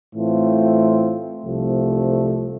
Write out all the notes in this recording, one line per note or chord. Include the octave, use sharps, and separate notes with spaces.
A2 E3 A3 C4 F4
C2 C3 F3 A3